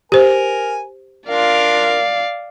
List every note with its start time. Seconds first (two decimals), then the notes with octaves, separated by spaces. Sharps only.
0.12 G4 A#4 C5 G#5
1.28 D4 F4 A#4 D5 F5